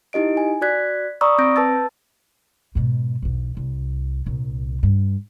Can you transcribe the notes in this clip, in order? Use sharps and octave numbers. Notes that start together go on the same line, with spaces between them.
D#4 E4 G4 D#5 D7
G#5
F#4 D5 F#6 G#6 B6
D5 A#5 B5 C#6 D#6 E6
C4 G6 A#6 D7
B4 A5 E6 A6
G#2 B2
B1 E2
C2
C2 A#2
G2